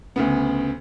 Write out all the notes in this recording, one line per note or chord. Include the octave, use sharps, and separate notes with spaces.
D2 C#3 B3